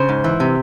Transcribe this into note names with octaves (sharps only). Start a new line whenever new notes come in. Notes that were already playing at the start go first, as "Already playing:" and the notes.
Already playing: C#3 C5
G#2
E3
C3